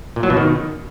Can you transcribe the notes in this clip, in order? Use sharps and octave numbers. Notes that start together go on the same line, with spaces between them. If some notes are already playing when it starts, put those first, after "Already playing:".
A#2
F#3
B2
D#3